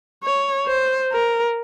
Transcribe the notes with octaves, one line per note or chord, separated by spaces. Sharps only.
C#5
C5
A#4